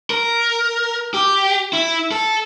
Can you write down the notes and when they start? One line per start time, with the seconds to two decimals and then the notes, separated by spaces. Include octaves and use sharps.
0.10 A#4
1.14 G4
1.73 E4
2.11 A4